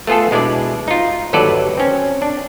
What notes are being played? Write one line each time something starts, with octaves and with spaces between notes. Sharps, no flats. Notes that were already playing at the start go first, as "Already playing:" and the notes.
A3 B3 F4 G#4 A4
B2 G#3 D4 E4 D5
D#4 F4
G1 D#2 F#3 A4 B4 D5
C4 C#4
D4